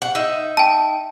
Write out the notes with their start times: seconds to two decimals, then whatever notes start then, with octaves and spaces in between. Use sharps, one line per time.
0.02 F#5
0.15 D#4 E5
0.57 G5 A5